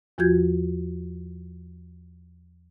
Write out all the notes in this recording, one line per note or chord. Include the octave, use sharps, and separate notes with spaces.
E2 F3 F4 F#4 G6 G#6